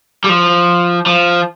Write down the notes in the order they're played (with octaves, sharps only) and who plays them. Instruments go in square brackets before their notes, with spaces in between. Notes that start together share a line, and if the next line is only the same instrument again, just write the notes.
[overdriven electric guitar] G3
F3
F3